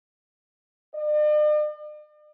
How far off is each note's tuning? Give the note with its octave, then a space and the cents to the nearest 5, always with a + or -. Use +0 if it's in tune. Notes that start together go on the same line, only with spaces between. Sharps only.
D5 +45